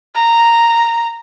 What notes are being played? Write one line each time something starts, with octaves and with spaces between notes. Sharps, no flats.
A#5